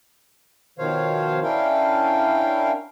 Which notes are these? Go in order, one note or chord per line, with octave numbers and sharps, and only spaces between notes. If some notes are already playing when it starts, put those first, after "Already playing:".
B2 D#3 F3 C5 C#5 F5
C#4 D4 E4 A#4 F5 G5